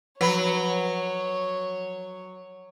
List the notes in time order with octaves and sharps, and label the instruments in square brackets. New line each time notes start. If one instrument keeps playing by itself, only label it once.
[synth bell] F3 [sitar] F#3 [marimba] B4 B5 [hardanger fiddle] C#5